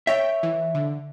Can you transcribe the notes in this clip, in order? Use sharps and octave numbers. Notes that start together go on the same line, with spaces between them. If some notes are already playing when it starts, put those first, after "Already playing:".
C#5 E5 G5
E3
D3